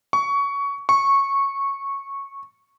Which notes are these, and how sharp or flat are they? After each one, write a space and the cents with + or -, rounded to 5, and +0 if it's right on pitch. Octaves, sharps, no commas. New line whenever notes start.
C#6 +20
C#6 -10